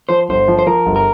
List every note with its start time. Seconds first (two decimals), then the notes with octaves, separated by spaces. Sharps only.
0.09 F3 C5
0.29 G1 C5
0.48 F3
0.59 C5
0.67 F3 A#4
0.86 G1
0.96 A#4